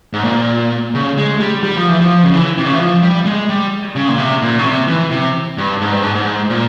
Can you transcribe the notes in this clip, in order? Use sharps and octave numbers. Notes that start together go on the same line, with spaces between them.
G#2
A#2
C#3
G#3
G3
G3
F3
E3
F3
C#3
E3
C3
C#3
E3
F3
G3
G#3
G3
C#3
A#2
C3
A#2
C#3
C3
E3
C3
G2
G#2
G2
G#2
G#2
A#2